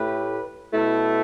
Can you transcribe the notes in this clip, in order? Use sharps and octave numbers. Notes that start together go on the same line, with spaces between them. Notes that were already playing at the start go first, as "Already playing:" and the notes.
Already playing: A2 A3 G4 B4
B2 A3 E4 A4